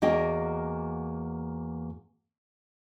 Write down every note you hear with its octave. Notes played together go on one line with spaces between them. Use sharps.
E2 A#3 F#4 D#5 G5